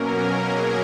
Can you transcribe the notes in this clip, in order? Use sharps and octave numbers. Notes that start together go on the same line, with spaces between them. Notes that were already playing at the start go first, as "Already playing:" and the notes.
Already playing: B2 F#3 A#3 C#4 A#4
G#4